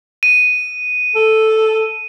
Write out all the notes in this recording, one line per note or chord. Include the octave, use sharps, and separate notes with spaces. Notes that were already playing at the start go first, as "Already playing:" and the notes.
D#7
A4